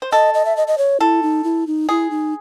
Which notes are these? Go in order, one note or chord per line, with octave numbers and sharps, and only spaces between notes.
C5
A4 D#5
D#5
E5
D#5
D#5
C#5
E4 A4
D#4
E4
D#4
E4 G#4
D#4